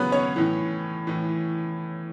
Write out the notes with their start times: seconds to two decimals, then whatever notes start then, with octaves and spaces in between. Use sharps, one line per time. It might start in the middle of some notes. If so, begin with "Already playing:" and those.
Already playing: C#3 F#3 B3 C#4 B4
0.12 C#4 C#5
0.36 A2 E3
1.07 A2 E3